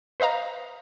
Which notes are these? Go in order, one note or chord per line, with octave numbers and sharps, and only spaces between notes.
B4 C5 D#5 F5 A#5